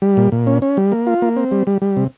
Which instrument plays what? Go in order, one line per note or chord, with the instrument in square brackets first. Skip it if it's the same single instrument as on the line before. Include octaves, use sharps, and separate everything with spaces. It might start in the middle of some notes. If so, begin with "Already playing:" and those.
[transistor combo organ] G3
A#2
A#2
C#4
C#4
G3
A#3
F4
A#3
C4
G3
G3
G3
C3